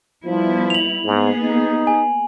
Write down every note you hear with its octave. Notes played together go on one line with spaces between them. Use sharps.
F3 G3 B3 E4
F7 F#7
G#2 A#3 B3 G#4
D#4
G#5